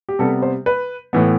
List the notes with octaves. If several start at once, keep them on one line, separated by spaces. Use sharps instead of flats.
G4
C3 G3 B3 A4
C5
B4
A2 E3 B3